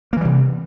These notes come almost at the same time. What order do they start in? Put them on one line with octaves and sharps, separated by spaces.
A#3 E3 G3 C3